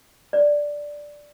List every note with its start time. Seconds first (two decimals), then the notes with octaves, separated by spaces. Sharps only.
0.33 D5